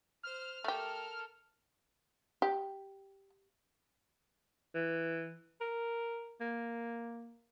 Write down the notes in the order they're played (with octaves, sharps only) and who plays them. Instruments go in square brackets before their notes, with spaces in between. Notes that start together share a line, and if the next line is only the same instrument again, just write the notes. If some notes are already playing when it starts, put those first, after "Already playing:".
[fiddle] C5 [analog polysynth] F6
[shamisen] A3 G4 [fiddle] A4 A#4
[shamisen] G4
[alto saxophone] E3
A#4
A#3